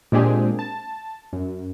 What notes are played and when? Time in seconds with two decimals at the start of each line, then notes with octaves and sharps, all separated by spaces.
0.12 A#2 G#3 C4 D4 G4 G#4
0.59 A5
1.33 F#2